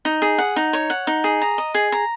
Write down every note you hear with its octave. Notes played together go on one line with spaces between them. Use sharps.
D#4
G#4
F#5
D#4
C#5
F#5
D#4
G#4
A#5
D#5
G#4
A#5